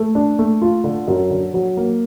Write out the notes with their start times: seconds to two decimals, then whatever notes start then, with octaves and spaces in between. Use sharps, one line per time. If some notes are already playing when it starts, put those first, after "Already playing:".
Already playing: A3
0.15 D4
0.39 A3
0.62 F4
0.84 D3
1.08 F#2
1.30 D3
1.54 F#3
1.77 A#3